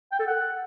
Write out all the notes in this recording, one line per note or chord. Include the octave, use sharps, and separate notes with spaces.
G5
A4
F#5